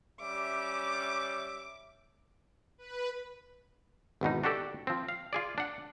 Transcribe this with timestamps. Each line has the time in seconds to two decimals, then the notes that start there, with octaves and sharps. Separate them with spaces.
0.21 G3 C#4 E5 D6
2.78 B4
4.21 G#1 E2 B2 D#4
4.44 D4 F#4 G4 A4 D5
4.87 F3 C4
5.09 F5
5.33 F4 G#4 D5
5.58 D4 F#5